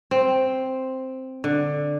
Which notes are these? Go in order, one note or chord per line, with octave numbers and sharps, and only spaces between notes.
C4
D3